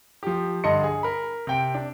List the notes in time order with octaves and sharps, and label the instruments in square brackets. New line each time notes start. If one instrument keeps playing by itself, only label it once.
[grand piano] F3 G4
G2 D3 D#5 C6 C#7
G#4
A#4 B5
C3 G5 D7
D4